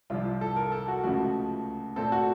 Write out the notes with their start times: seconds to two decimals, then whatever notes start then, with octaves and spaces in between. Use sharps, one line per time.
0.10 C2 C3 F3 F4
0.41 A4
0.56 A#4
0.72 A4
0.88 F#4
1.04 C#2 C#3 F3 A3 F#4
1.96 A#2 A3 C4 A4
2.12 F#4